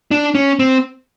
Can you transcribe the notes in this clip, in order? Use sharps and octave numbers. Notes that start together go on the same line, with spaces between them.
D4
C#4
C4